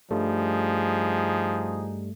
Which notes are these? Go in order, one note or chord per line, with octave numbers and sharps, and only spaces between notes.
G2 F3 G3 A3 D#4 G#4